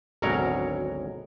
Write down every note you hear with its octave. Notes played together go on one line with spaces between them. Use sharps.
G#1 D2 B2 F#3 A#4 C#5